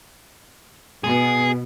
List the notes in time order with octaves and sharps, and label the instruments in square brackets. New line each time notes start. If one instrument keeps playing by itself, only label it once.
[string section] B2 [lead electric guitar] G#4